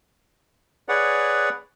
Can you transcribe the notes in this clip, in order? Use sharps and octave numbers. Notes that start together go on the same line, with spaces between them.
G#4 B4 C#5 D5 F#5